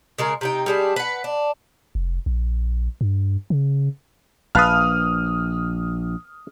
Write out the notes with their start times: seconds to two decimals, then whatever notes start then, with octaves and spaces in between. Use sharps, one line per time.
0.18 C#3 G#3 A#4
0.41 C3 D#4 G5
0.66 G3 G#3 D4
0.96 B4 F#5
1.24 D4
1.95 F1
2.26 A#1
3.01 G2
3.50 C#3
4.55 A#1 B4 F5 A5 D#6 F6